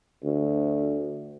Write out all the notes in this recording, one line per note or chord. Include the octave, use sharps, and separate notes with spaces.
D2